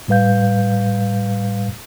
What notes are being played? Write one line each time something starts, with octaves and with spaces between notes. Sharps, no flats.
A2 G3 B4 F5 G6